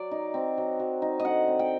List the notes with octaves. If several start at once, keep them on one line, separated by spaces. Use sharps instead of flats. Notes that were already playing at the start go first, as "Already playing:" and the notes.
Already playing: F#3 D5
D#4
C4
F#3
F#3
D#4
D#5
D3 F#5
C4
G5